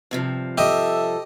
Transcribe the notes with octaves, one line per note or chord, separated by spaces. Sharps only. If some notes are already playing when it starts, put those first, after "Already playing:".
G2 C3 F3
G4 A4 D#5 E5